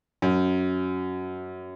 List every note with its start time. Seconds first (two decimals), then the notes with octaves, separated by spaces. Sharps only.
0.22 F#2